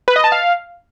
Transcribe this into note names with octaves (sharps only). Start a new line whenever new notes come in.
B4
D#5
A5
F5